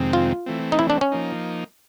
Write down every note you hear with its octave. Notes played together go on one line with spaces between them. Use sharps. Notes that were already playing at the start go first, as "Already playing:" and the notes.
Already playing: F2 C3 D#3 G#3 C4
F4
E3 A3 C4
D#4
E4
D4
C#4
F3 A#3 D#4